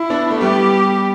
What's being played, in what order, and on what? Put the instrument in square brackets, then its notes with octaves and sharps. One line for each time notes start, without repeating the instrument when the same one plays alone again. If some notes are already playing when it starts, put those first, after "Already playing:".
Already playing: [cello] E4
[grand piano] B3 D4
A3
[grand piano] G3 B3 [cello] G4